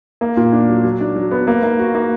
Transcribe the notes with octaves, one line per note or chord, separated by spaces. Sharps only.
A#3
A#2
D4
F#3
F#3
D4
F#3
B3
A#3
A#3
F#4
A#3